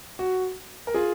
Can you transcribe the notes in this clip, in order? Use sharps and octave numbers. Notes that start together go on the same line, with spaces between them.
F#4
A#4
F4 G#4